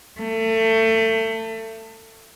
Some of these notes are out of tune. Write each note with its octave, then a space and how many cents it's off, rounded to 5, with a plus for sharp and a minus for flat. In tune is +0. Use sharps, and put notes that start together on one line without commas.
A3 +25